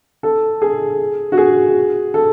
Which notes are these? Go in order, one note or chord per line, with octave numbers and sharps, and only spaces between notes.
A4
G#4
F#4
G#4
A4